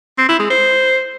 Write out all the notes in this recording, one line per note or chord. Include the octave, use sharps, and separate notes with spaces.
C4
E4
G#3
C5